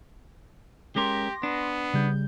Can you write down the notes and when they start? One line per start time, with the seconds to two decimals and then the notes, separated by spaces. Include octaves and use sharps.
0.96 G#3 C#4 G4 A#4 C6 D6 A#6
1.43 B3 D4
1.94 C#3 G3 G6